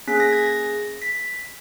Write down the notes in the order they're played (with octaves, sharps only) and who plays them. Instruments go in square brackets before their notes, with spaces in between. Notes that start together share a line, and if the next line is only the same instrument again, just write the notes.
[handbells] A#3 C#4 G#4 B6
A#6
G#6
A#6
B6